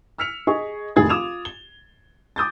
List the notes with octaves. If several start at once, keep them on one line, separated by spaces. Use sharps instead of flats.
E6 F6 B6 C#7 F7
G#4 D#5 C#6
F1 D#3 A3 G#4 G#6 A6
F4 D6 D#6 G#6 E7 F7
G7
D6 D#6 G6 A6